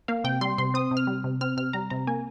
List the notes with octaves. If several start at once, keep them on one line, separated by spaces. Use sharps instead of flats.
A#3 F5
C3 G5
G3 C6
C3 C6
C4 D#6
C3
F6
G3
C3
C4 F6
C3 F6
G3 A#5
C3 A#5
A#3 G#5